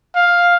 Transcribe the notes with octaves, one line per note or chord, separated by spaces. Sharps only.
F5